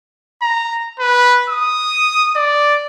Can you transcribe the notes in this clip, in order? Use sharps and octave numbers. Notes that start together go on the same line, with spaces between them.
A#5
B4
D#6
D5